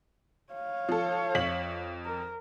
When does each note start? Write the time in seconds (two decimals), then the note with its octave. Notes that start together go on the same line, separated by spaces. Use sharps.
0.53 C#5 F5
0.89 F3 A4
1.35 F2 B6 F#7
2.05 A#4